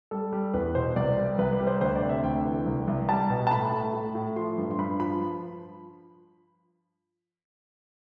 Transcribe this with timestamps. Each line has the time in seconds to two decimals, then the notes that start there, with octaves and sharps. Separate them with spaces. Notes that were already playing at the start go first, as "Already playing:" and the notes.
0.11 G3 A4
0.33 G3
0.54 E2 B4
0.75 B2 C5
0.96 C2 D5
1.17 G3
1.38 C2 B4
1.53 B4
1.60 G3
1.67 C5
1.81 D2 C5
1.96 D5
2.02 C3
2.09 E5
2.24 D2 G5
2.45 E3
2.66 C2
2.88 C2
3.09 G3 A5
3.30 B2
3.47 A5
3.51 A2 B5
3.72 A2
3.94 A2
4.15 A2
4.36 F3 C6
4.58 G2
4.71 C6
4.78 G2 B5
5.00 F3 B5